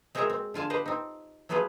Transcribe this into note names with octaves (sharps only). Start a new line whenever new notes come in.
G#3 C4 F#4 G#4 A#4 E5
C4
D3 F4 G#5 A5
G4 B4 C5 D#5
C4 D#4
F#3 A3 B3 F4 G#4 B4